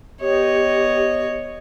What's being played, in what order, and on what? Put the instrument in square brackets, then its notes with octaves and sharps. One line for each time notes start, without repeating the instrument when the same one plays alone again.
[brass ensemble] B3 D#5 [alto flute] G4 [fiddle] C#5